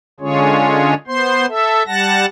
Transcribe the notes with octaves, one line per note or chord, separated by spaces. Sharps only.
D3 G#3 C#4 F4 G#4 C#5
B3 C5 C6
A4 E5
G3 F#5 A5 A#6